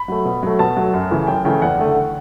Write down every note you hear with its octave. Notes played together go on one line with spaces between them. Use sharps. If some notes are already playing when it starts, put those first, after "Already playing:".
Already playing: B5
F#3 A3
B2
F#3 A3
B2 A5
F#3 A3
F#2
C#3 E3 A3
F#2 G5
C#3 E3 A3 G5
E2 F#5
D3 A3